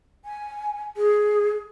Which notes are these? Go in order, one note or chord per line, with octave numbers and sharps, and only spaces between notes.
G#5
G#4